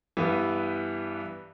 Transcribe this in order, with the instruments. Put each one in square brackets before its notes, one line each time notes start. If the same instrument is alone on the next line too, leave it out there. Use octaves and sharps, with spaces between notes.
[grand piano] G2 E3 B3